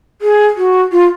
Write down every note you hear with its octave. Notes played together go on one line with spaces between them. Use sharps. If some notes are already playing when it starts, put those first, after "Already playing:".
G#4
F#4
F4